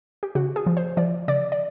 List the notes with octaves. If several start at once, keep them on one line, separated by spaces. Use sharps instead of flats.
G4
C#3 F#4
G#4
F3
C5
F3 D5
C#3 D5
D5